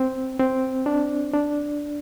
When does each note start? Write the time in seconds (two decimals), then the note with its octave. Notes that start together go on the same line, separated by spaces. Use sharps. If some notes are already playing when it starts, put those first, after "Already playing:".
Already playing: C4
0.39 C4
0.86 D4
1.33 D4